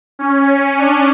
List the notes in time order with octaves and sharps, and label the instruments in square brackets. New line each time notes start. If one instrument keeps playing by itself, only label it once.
[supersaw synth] C#4
D4